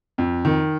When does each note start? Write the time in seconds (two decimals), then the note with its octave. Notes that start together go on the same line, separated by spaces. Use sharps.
0.18 F2
0.45 D#3